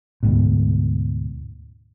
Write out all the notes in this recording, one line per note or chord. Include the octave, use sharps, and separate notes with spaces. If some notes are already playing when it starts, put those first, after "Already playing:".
D2 G#2 B2